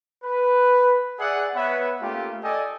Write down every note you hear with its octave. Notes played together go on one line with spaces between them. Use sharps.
B4
G#4 D5 E5 F#5
B3 B4 C#5 E5 F#5
A3 A#3 C#4 F4 G4
A4 D5 D#5 G5 G#5